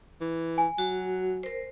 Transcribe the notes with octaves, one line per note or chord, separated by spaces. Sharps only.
E3
G#5
F#3 F#4
A#4 C5